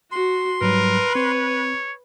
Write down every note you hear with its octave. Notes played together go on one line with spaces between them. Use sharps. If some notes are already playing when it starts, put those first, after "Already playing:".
F#4 C6
G#2 F#3 G3 A#4 B4
C4 C#5